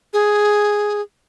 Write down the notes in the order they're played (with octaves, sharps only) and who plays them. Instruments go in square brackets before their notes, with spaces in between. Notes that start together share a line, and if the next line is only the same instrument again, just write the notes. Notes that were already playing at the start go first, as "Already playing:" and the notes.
[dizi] G#4